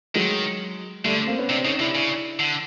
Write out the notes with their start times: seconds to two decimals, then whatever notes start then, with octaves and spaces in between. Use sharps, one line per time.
0.15 D#3 F#3 G#3
1.04 D3 G3 A3
1.27 A#3 C4
1.38 B3 C#4
1.49 C3 C4 D4
1.64 C#3 C#4 D#4
1.79 C3 D4 E4
1.95 C#3
2.39 D3